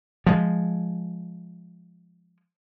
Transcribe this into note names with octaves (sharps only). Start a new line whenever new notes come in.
F3 G#3